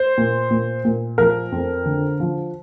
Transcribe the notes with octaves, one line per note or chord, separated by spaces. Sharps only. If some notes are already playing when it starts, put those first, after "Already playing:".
Already playing: C5
A#2
A#2
A#2
F3 A#4
F2
D3
F3